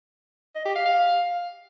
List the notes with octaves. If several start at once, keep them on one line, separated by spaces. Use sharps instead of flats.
D#5
G4
F5
F5